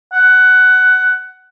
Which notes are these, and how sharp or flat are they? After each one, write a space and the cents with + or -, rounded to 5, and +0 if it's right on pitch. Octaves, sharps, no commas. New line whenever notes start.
F#5 +10